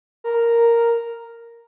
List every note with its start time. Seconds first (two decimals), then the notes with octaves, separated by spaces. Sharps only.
0.24 A#4